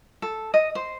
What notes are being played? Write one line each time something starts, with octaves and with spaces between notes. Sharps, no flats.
A4
D#5
C5